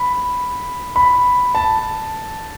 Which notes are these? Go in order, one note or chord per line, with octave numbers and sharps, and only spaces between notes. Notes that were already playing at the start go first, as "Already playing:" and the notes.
Already playing: B5
B5
A5